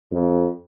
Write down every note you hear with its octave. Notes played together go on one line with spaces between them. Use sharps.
F2